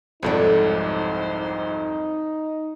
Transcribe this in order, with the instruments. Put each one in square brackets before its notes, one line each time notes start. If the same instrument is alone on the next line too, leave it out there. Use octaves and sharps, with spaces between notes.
[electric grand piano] C2 F2 G#2 [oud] F#3 A4 D5 [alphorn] D#4 [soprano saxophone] C5